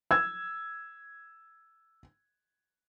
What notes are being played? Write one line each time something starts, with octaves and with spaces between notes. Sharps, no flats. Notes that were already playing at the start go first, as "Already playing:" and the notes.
E6 G#6